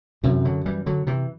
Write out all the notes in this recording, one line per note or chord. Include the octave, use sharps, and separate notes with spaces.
F#2 C3 E3
D3 F#3
E3 G3
D3 F#3
C3 E3